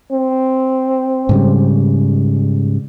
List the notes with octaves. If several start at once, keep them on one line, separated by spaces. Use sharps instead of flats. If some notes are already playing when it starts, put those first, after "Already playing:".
C4
G#2 C#3 G3